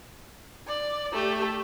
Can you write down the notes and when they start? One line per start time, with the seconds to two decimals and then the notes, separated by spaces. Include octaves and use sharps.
0.67 D5
1.13 A3 G4